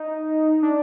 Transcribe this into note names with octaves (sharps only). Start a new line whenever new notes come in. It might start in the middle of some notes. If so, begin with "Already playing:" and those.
Already playing: D#4
D4